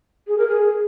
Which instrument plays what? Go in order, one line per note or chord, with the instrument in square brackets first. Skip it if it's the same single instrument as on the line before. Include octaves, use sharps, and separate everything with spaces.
[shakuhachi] G#4
A#4
G#4